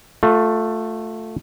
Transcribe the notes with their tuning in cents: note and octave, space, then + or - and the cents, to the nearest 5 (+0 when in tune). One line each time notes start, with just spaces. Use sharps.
A3 +5 F4 +30